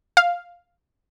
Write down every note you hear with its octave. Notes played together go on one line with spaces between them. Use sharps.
F5